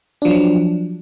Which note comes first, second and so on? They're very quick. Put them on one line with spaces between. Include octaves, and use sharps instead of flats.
D4 F3 F#3